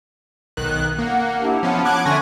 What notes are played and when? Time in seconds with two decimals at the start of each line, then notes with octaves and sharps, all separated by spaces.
0.57 B1 D#3 F#6
0.98 A#3 F#5
1.42 D4 E4 G4
1.63 F3 B3 C#4 F#5 A5
1.85 D6 F#6 G#6
2.05 D3 C#4 A4 E5 G#5 C6 A#6